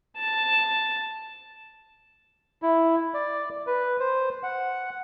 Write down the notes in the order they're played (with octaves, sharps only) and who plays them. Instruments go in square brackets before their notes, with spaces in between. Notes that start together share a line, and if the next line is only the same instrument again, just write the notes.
[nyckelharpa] A5
[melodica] E4
D5
B4
C5
F#5